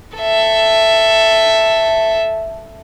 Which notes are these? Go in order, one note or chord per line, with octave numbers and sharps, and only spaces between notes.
A4 E5